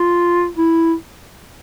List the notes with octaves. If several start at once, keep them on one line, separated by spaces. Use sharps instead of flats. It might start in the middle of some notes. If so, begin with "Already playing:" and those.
Already playing: F4
E4